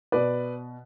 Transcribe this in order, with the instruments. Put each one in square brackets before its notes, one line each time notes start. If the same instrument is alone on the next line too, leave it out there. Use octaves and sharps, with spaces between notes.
[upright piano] B2 B4 D5